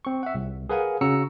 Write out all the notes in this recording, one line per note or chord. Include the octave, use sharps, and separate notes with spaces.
C4 C#6
E5 F#5
C2
G#4 A#4 B4 F5 F#5 G#5
C#3 C#4 F#4 A#5 E6 C#7